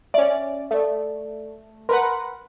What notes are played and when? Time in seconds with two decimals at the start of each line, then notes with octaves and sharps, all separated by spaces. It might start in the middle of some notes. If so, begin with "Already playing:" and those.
0.14 C#4 D5 E5
0.71 A3 A4 D5
1.89 A#4 B4 F#5 C6